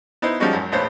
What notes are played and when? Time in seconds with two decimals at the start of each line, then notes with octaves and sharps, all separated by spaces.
0.22 B3 D#4 E4 C5
0.40 F3 G3 G#3 C#4 D#4 F#4
0.53 G#1 F#2
0.72 A#1 E2 A2 B3 C5 C#5